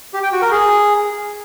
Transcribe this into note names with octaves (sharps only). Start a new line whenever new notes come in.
G4
G5
F#4
A#4
G#4